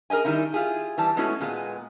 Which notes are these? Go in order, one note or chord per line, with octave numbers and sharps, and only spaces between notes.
G#4 A#4 C5 D#5 G#5
D#3 G3 D#4 E4
E4 F4 G4 G#4
E3 G3 A5
G#3 A3 B3 C#4 E4 F#4
A#2 G#3 B3